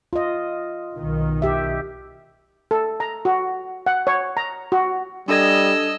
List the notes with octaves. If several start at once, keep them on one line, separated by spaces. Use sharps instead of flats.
F4 D#5
B1 D#3
G4 E5
A4
A#5
F#4
F#5
C#5
A#5
F#4
G3 D4 A4 D#5 E6 G#6